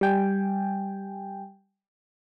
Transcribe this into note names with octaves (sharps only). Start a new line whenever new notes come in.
G3 G5 G#5